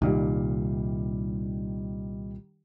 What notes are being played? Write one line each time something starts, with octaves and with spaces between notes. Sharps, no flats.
C2 A#2 D#3 G3